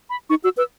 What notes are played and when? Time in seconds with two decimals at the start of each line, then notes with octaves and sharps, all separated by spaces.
0.10 B5
0.30 D#4 C#6
0.44 F#4 E6
0.57 B4 E6